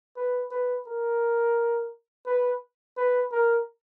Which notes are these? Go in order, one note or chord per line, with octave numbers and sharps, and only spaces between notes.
B4
B4
A#4
B4
B4
A#4